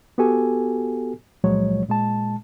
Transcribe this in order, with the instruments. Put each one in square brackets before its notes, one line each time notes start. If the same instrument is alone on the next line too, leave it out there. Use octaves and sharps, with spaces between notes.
[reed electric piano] B3 F#4 G4 A4 G#5
C#2 A#2 F3 F#3 G#3 C#5
A#2 G#3 A5